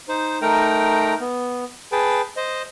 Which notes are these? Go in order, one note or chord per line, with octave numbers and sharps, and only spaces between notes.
D#4 C5
A3 D#4 A#4 G5 A#5
B3
G#4 B4 G5 A5
C5 D#5